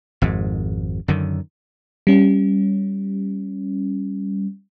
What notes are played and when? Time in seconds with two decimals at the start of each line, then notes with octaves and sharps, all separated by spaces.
0.22 G#1 F2 G#2
1.08 F#2 D3 D#3
2.07 G3 C#4